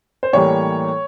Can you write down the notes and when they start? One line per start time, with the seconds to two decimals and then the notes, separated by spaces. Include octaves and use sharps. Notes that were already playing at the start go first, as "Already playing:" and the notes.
0.23 C5
0.33 A2 E3 G3 A#3 C#5